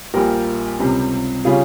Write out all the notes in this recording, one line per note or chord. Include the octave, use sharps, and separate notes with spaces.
A#1 A#2 G3 G4 A#4
C#2 C3 G3
C#3 G3 F4 G#4